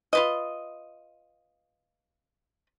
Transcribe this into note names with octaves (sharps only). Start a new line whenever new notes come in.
F4 B4 D#5